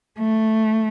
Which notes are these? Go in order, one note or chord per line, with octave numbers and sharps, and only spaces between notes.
A3